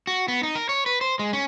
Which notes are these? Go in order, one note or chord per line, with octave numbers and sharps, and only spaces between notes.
F#4
B3
D#4
A#4
C#5
B4
C5
G#3
C#4